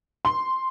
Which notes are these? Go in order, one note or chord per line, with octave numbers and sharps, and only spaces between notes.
C6